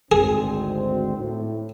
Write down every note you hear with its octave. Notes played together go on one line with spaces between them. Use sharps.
G#1 D2 C4 G#4
A2